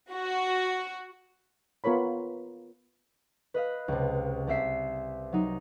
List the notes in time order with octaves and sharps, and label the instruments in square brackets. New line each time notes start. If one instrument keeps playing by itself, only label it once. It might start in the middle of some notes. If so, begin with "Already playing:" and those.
[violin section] F#4
[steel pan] B3 F4 A#4 C#5 B5
[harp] B4 D#5 F5 F#6
C#2 C3
C2 C4 E5 C7
F#3 D#4